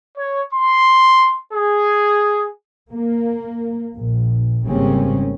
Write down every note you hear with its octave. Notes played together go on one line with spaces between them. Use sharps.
C#5
C6
G#4
A#3
A#1
G#1 C#3 G3 A#3 C4 C#4